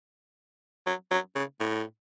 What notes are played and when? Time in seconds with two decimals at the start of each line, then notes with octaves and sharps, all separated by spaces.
0.86 F#3
1.11 F#3
1.35 C#3
1.60 A2